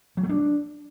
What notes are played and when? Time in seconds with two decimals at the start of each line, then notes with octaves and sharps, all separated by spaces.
0.17 F#3
0.23 A3
0.29 D4